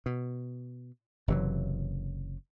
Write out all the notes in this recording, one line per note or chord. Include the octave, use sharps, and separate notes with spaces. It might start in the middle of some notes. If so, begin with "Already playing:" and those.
B2
F#1 C3 E3 F#3